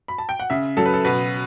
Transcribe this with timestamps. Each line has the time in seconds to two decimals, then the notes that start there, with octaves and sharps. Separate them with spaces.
0.08 B5
0.18 A5
0.29 G5
0.40 F#5
0.50 C#3 E5
0.77 F#3 A4
0.86 B4
0.94 A4
1.05 B2 B4